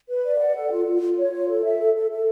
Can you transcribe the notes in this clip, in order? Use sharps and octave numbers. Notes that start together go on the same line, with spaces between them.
B4
D5
F#5
A4
F4
F4
F4
C#5
F4
A4
E5
A4
A4
A4